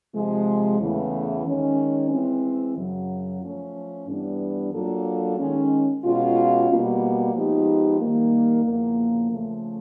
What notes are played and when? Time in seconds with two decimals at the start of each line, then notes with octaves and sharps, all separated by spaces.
0.14 C3 F3 G#3
0.79 E2 C#3 E3 A3
1.45 D#3 G#3 C#4
2.10 E3 G#3 C4
2.75 F#2 C#3 F#3
3.41 F3 A3 C#4
4.07 G2 E3 G3 B3 D4
4.72 F#3 A#3 D4 F4 A4
5.38 D#3 G#3 C#4
6.03 B2 G#3 C#4 F4
6.69 B2 G3 A#3
7.34 F3 G#3 B3 D#4 G4
8.00 D#3 G3 A#3
8.65 E2 C#3 F3 A#3
9.31 C#3 F3 A3